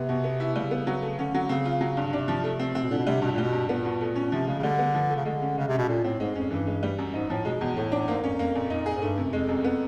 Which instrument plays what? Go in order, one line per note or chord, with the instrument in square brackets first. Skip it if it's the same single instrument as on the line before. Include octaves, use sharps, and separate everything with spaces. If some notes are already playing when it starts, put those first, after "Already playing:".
Already playing: [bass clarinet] C3 [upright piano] B3
[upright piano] B2
B3
E4
[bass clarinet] C#3 [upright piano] G3
[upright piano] B3
F#3
A3
[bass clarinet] D3 [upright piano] C#4
[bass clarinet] D3 [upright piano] F#3
[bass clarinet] C#3 [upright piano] C4
[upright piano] F4
F#3
G2
[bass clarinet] C#3
[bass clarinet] C3 [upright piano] D4
[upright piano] F3
A3
C4
[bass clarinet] C3 [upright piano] C4
[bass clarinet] B2
[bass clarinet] A#2 [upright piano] D3
[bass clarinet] B2
[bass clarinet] C3 [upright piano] G3
[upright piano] G2 [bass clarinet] B2
[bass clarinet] A#2
[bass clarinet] B2 [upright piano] G3
[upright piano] G2
[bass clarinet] A#2 [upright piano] B3
[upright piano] B2
A3
C#4
[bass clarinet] C3 [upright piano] F3
[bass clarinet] C#3 [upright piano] G#3
[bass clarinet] C#3
[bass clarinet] D3 [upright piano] G3
[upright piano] B3
F3
A3
[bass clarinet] C#3
[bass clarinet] D3 [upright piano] G#3
[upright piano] C#4
[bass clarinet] C#3 [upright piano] G#3
[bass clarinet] C3
[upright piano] C#4
[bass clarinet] B2
[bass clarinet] A#2 [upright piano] A3
[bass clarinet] A2 [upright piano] C4
[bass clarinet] G#2 [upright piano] G#3
[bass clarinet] F2 [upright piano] C#4
[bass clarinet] G2 [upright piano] E3
[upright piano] G#3
G3
F#2
[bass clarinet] G#2 [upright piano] D#4
[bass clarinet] A2 [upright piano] F3
[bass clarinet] B2 [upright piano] G#3
[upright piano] E2 [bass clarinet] B2
[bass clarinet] A2 [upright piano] A3
[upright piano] D4
[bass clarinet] G#2 [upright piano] A#3
[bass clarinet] F2 [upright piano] C#4
[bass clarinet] F2 [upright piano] A#3
[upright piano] A#2
[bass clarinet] F2 [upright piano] D#4
[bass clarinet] F2 [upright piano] G#4
[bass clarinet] G#2
[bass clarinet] G2 [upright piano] A3
[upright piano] C3
[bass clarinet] F#2
[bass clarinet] F2 [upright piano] G#3
[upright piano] F#2
B3